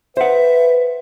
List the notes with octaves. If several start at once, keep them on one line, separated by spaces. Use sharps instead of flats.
B4 C5 E5 F#5